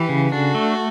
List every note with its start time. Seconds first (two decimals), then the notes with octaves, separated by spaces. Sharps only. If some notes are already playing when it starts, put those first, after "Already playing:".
Already playing: E3 G4 B4
0.09 C#3
0.32 D4 F#4 A4
0.55 A3